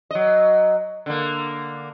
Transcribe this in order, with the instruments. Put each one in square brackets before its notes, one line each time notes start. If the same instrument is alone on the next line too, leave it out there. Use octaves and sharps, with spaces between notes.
[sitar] F#3 D#5
D3 A#3